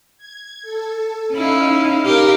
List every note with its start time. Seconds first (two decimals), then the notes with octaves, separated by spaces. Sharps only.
0.18 G#6
0.62 A4
1.33 C#4 D#4 E4 F5
2.05 G4 A#4